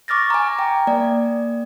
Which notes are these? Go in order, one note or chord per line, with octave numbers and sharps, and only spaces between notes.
C#6 D6 F6 A6 A#6
G#5 A#5
G5
A#3 D5